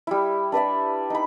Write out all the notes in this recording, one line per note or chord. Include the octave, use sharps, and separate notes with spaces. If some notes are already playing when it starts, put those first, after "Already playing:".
G3 E4
D4 B4 D5 E5
D#4 B5